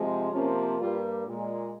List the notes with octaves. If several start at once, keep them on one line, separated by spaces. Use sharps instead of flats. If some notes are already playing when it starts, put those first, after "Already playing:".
Already playing: C3 F3 G#3
C3 F3 A#3 C#4
G2 G3 A#3 F4
A#2 G#3